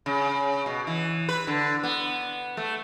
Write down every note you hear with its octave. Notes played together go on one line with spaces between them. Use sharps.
C#3
B2
E3
B4
D3
B3
A3